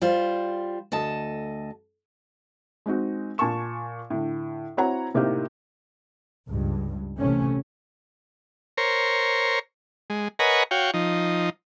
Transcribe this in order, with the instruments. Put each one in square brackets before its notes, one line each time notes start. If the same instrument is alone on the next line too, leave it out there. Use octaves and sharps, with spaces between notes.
[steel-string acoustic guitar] G3 F4 C5
D2 A4 D#5 A5
[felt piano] G#3 C4 D#4 F#4
A#2 G#5 A5 C#6 E7
A2 D3
C4 E4 F#4 C#5 F#5 A#5
A2 C3 A#3 C4 D#4 G4
[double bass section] C#2 G2
A1 A2 C3 A3 C#4
[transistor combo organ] A#4 C5 C#5
G#3
A#4 B4 C#5 D#5 F#5 G#5
F#4 C#5 F5 G5
F3 D#4